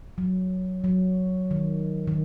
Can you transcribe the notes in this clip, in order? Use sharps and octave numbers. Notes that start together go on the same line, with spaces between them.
F#3
F#3
D#3
D#3